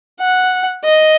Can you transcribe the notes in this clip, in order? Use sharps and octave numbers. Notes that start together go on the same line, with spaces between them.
F#5
D#5